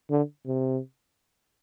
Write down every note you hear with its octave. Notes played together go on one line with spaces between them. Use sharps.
D3
C3